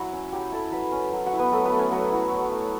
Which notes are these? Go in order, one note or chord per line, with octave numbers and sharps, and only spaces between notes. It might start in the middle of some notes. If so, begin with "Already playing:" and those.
Already playing: F#3 E4 F#4 F#5 B5
C#4
F#3 G4 G5
E4 A4 A5
F#3 B4 B5
C#4
F#3
F#4 F#5
E4
B3 B4
F#3 A3 A4
B3 B4
A3
C#4 C#5
F#3 F#4
E4
F#3
A3